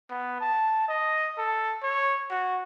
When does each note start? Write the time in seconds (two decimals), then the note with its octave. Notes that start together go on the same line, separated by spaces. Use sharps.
0.11 B3
0.41 A5
0.89 D#5
1.38 A4
1.83 C#5
2.31 F#4